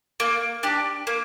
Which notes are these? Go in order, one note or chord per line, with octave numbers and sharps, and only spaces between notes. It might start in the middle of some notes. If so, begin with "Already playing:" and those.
A#3
D4 G4
A#3